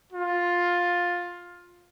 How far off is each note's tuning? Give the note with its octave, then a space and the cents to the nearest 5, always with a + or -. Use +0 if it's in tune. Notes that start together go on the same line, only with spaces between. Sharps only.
F4 +10